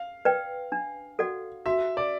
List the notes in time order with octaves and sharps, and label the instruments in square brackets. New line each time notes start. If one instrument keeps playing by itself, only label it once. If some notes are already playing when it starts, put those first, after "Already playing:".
Already playing: [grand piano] F5
[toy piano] B4 D5 G5
D4
F#4 A4 D5 F#5
[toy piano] F#4 [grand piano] E5
[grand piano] D5